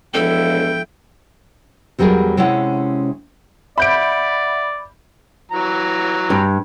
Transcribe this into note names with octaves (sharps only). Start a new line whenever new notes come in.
E1 F3 E4 A4 G5
E2 F#3 G3 C#4 G#4 A#4
C3 G#3 C#4 E4 C#5 F#5
D5 E5 F#5 B5 G6 D7
E3 F#3 A#5
G2